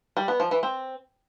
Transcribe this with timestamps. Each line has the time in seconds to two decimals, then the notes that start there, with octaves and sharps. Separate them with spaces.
0.17 G3
0.28 B3
0.40 F3
0.51 E3
0.63 C4